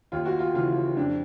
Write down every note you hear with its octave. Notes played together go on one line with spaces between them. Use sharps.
D#2 F4
F#4
F4
C#3 E3 F4
F2 D4